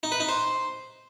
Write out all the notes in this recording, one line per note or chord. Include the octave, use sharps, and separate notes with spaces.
D#4
B4
D#4
C5